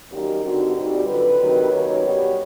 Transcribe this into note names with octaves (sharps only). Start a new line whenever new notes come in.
F#2 D#3 G3 A#3 D#4 G4
G2 D3 G3 C4 D#4 F#4
A#2 G3 C4 D#4 F#4
F2 D3 F#3 B4
D2 C3 D#3 F#3
D#2 D#3 F#3 A#3 C#4 C#5
B2 G3 B3